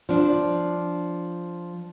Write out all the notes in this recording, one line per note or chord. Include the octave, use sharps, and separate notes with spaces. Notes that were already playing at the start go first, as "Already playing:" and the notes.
F3 D4